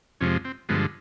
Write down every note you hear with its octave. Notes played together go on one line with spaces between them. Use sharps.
F2 C3 F3 G#3 C#4
C4
G2 D3 F3 G#3 B3